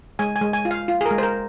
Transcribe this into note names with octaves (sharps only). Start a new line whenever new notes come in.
G#3 G#5
G#5
G#3
G#5
F4
F5
F4
G#4
A#4
G#3
C5
A#4